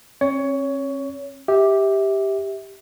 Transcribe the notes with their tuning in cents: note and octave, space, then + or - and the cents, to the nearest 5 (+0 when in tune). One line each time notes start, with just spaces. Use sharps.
C#4 -45 C#5 +15
G4 +0 E5 -25